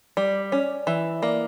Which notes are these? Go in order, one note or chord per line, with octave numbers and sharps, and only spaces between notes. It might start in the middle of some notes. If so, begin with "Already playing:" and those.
G3 D5
C#4 D5
E3 E5
A#3 D5